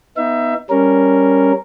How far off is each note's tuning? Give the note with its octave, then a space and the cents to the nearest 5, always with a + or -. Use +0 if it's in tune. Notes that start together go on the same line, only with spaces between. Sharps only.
B3 +0 D#4 +15 E5 +25
G3 +0 C#4 +0 A#4 +0